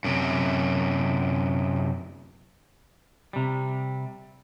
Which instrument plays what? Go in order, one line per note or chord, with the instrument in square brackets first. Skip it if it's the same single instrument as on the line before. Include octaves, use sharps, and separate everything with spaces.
[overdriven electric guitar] F#2 C3
[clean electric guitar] C3 G3